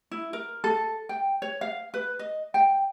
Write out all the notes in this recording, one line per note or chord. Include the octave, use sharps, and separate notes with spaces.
E4
A#4
A4
G5
C#5
F5
B4
D#5
G5